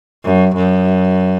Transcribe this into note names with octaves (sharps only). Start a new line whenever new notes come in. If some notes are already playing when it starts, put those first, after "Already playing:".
F#2
F#2